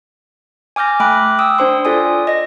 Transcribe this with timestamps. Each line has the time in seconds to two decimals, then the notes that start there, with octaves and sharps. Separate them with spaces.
0.76 G#5 D6 F6 G6 A#6
1.00 A3 G5 B5 D6 F#6
1.39 G5 D#6 E6
1.58 D4 C5 C6
1.85 F4 A4 D5 G#5 D#6
2.27 D#5 A#6